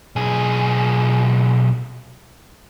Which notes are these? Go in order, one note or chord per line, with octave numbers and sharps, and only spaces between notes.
B1 G#4